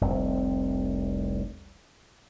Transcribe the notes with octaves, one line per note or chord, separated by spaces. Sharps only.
F1 C2 C4